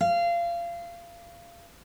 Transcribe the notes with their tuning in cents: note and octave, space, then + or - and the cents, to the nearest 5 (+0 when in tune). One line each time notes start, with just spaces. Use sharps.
F5 -25